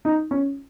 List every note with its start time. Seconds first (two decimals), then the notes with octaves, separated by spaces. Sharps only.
0.05 D#4
0.31 C#4